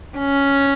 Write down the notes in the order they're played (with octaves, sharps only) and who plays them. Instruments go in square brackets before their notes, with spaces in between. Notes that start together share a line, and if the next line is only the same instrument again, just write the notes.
[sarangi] C#4